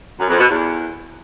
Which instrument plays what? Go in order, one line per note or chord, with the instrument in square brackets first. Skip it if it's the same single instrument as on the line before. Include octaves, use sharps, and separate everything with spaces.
[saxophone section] F#2
F2
B2
E2